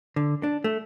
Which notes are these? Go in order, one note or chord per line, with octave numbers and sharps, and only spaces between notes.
D3
D4
A3